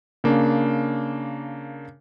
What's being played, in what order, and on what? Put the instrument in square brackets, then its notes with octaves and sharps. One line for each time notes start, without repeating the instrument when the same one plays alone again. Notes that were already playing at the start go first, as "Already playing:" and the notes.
[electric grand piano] C#3 A#3 D4